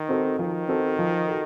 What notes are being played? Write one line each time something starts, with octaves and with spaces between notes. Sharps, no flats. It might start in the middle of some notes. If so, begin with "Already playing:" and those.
Already playing: D#3
C4 F#4 A4
D#3 F3
C4 F#4 A4
F3
F#4 A4